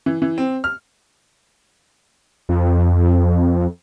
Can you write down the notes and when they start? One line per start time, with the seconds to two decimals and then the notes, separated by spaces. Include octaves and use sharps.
0.06 E3
0.22 E3
0.38 C4
0.64 F6
2.49 F2